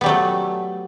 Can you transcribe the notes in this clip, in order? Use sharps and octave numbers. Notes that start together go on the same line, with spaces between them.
F#3 G3 A3 B3